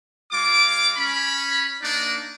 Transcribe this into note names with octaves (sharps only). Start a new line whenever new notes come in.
G#3 F4 D6
C#4 B5
A#3 D4 D#4 D5